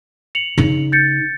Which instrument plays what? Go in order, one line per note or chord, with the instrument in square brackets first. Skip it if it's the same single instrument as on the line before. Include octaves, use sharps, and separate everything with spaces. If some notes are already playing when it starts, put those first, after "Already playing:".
[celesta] C#7 F7 F#7
[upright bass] C#3 D#4
[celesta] G6 A6 C#7